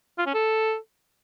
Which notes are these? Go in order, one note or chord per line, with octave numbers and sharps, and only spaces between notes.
F4
C#4
A4